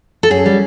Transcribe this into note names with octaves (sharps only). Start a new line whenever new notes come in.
A4
F#2 G#4
G3